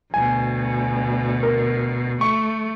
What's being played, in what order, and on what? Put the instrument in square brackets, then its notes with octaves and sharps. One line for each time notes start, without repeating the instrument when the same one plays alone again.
[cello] D2 B2 [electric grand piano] G#5
[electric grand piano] A#4
[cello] A3 [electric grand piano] C#6